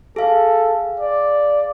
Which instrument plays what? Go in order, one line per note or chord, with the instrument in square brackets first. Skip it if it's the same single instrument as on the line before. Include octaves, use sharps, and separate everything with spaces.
[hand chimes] G#4 F5 [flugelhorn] A4
[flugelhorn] D5